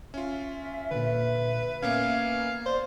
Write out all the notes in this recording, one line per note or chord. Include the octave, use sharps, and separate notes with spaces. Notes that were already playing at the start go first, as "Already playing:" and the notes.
C#4 F4 E5
A#2 D3 B4
A#3 B3 C#4 F5 G#6
C5 D5